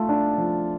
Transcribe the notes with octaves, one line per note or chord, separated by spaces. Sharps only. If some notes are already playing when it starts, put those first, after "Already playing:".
Already playing: A3 F4
D4
F3